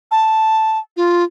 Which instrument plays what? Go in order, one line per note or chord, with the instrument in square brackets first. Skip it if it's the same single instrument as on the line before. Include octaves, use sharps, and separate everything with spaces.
[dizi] A5
F4